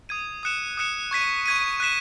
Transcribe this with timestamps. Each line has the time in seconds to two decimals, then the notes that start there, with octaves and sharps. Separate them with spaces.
0.09 D#6 G#6 D#7
0.43 D#6 F#6 C#7 E7
0.77 D#6 F#6 C#7 E7
1.11 C#6 G#6 B6 D#7
1.46 C#6 G#6 B6 D#7
1.80 F#6 B6 E7